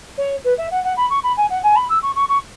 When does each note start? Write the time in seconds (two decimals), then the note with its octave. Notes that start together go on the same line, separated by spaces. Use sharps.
0.18 C#5
0.44 B4
0.58 E5
0.71 F#5
0.84 F#5
0.97 B5
1.10 C#6
1.23 B5
1.37 G#5
1.50 F#5
1.63 G#5
1.76 B5
1.89 E6
2.02 C#6
2.15 C#6
2.29 C#6